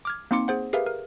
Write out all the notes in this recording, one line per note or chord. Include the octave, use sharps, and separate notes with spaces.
D6 F6 G#6
A#3 C4 D#4 C6 D6 C#7
G#4 C5 F#5
G4 G#4 A#4 B4 E5 F5
A#4